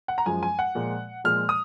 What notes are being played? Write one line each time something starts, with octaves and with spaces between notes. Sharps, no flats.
F#5
A#5
F#2 F3 G#3 G#5
G#5
F#5
A#2 F3 G#3
A#2 F3 G#3 F6
D#6